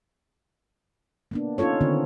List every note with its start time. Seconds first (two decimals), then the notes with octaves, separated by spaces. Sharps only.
1.31 A#3 B3 D4
1.58 C#4 D#4 F4 A4 C#5
1.81 D3 D#3 B3 C4